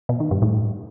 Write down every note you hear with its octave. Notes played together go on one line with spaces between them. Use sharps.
B2
D#3
G2
A2